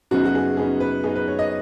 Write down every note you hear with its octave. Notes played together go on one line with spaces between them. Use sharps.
F#2 C#3 B3 D#4 F#4
F#4
G#4
F#2 C#3 B3 D#4 G#4
B4
F#2 C#3 B3 D#4 G#4
B4
C#5
D#5